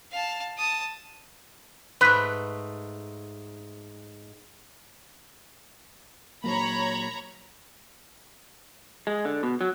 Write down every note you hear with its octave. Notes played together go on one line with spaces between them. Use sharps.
F5 A5
A5 D#6
G#2 A3 B4
A#2 F#3 A#3 C#5 A#5 B5
G#3
D3
B2
F#3